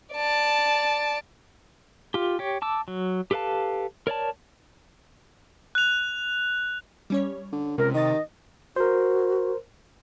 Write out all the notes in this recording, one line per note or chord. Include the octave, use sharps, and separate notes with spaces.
D5 A5
F4 G4
G4 C#5
A5 D6 E6
F#3
G4 A4 B4 F5 A5
A#4 C#5 D5 A5
F#6 F7
G3 C#4 C#5
D3
C#2 C3 A#4
D#3 D#5 D#6 A6
F#4 A#4 C5